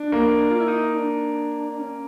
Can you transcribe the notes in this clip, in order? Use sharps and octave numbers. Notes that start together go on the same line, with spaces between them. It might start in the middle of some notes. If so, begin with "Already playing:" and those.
Already playing: D4
A#3
F4
E4
D#4
D4
D4
C#4